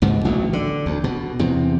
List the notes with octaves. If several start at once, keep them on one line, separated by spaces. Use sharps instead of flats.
C#2 G#2 B2
A1 D2 F#3
D3
D2
B2
E2 C3